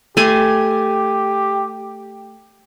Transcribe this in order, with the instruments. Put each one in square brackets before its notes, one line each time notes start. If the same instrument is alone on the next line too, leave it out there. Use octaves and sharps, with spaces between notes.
[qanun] A3 G#5 C6 [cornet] G4